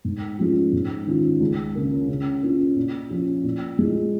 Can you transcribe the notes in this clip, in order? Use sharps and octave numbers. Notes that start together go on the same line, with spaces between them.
G#2
F3 G#3 C#4 F4
G#2
D#3 C#4 F4
C#2
C#3 A#3
C#3
A#3 C#4 F4
A#2
F3 C#4 F4
A#2
G#3 F4